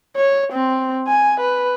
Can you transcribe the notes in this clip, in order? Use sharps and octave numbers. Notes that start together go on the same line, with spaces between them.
C#5
C4
G#5
B4